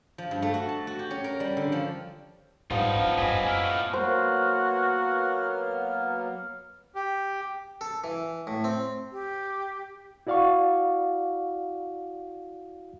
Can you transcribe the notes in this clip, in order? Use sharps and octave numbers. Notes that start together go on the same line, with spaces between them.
F3
G2
A3
F#4
A5
F#4
G4
C#4
A#4
G3
D3
F3
G#2 F3 G3 B3 D#4 F4
F3 C#4 D4
G#1 F#2 C4 B4 D5 D#5 G#5 B5
F#2 B3
A#3 E4 F6
A2 A3
F#3 A#3 B3 F#4 C5 F6
G4
A4
E3
A2
C4
G4
E4 F#4 D5 F5 F#5 C#6